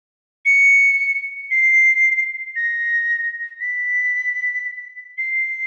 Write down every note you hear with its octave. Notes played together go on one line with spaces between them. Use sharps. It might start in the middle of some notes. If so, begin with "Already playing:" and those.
C#7
C7
A#6
B6
C7